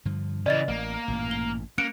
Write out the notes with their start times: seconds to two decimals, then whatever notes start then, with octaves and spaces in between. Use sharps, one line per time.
0.05 G2 D3 F3
0.46 C#3 E3 C#4 D5 D#5 A6
0.68 A1 A#3
1.08 A1 G2 A#2
1.31 G7
1.78 A#3 C#4 F#6 C#7 D7